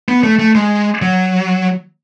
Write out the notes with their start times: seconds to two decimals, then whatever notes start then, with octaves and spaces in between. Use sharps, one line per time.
0.08 B3
0.24 A3
0.39 A3
0.55 G#3
1.02 F#3